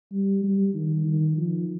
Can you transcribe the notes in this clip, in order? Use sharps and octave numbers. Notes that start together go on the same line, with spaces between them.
G3
G3
D#3
D#3
F3